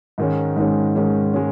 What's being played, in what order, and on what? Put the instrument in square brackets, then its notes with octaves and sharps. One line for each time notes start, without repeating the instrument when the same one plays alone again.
[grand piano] G#2 D#3 G#3 C#4
G#2 D#3 G#3 C#4
G#2 D#3 G#3 C#4
G#3 C#4